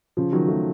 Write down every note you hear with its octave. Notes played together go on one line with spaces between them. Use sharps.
C#3 F3
D#3 F#3
F3 A3